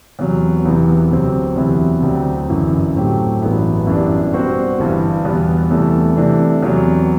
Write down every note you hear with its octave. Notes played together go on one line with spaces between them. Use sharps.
E2 C3 F#3
E1 E2 C3 E3 B3
D2 C3 F#3 C4
E2 C3 F#3 B3 E4
D2 D3 F#3 C4 G4
G1 F#2 E3
A2 F#3 A3 C4 G4
A1 G2 F#3 B3 E4
F#2 E3 G3 B3 D4
B2 G3 C4 F#4 C5
G1 G2 E3
E2 B2 G3 B3
E2 C3 E3 A3
C3 E3 A3 D4
E2 C3 F#3